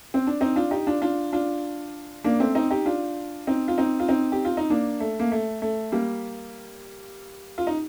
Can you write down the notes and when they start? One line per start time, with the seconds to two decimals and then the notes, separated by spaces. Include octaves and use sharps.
0.14 C4
0.27 D4
0.41 C4 D#4
0.56 D4 F4
0.71 D#4 G4
0.87 D4 F4
1.02 D4 F4
1.33 D4 F4
2.24 A#3 D4
2.40 A3 C4
2.55 C4 D#4
2.70 D#4 G4
2.85 D4 F4
3.47 C4 D#4
3.68 F4
3.78 C4 D#4
4.00 F4
4.08 C4 D#4
4.32 G4
4.45 F4
4.57 D#4
4.70 A#3 D4
5.00 A3
5.20 A#3
5.32 A3
5.62 A3
5.92 G3 A#3
7.58 F4
7.67 D#4